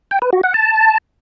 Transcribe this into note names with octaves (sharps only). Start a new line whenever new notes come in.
G5
B4
F#4
F#5
A5